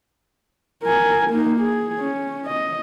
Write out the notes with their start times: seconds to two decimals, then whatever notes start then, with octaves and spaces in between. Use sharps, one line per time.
0.84 A#4 G#5
1.31 A#3 D#4
1.60 G#4
2.00 C#4
2.46 D#5